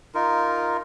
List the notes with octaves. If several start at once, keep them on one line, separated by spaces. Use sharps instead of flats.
D#4 F4 A#4